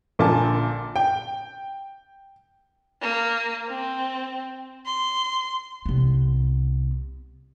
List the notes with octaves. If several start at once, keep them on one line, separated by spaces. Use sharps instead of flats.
A#1 A#2 D3 G#5 A5
G5
A#3
C4
C6
C2 B3